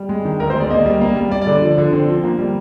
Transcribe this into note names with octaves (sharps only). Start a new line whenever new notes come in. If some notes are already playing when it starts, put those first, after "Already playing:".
Already playing: G3
G#3
D#3
D2 A#4
C5
G#3
D5
A#3 D#5
G3
A#3
G3
G3 D5
D5
D3
D5
F3
D3
C4
F3
A#3
G3